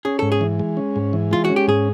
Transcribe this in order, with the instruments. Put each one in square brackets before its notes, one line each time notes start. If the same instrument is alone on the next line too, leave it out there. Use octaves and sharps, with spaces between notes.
[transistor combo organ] C#4 [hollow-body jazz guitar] G#4
[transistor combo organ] G#2 [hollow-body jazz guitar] A4
[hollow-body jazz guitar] G#4
[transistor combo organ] E3
G#3
C#4
G#2
E3
[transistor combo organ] G#3 [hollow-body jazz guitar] F4
[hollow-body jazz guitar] F#4
[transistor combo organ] C#4
[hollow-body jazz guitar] G4
[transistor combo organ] G#2 [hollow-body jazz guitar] G#4